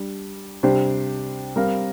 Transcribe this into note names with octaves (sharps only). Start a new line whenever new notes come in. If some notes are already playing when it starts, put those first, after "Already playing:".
Already playing: G3 D4
C3 G3 D4 G4 C5
G3 C4 A#4 F5